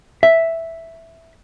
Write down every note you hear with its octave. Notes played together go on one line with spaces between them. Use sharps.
E5